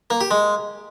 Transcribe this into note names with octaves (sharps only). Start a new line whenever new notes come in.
A#3
G4
G#3